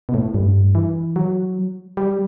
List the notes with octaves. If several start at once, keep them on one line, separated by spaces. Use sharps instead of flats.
B2
A2
G2
E3
F#3
G3